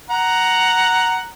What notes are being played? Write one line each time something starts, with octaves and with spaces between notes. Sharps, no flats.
F#5 A#5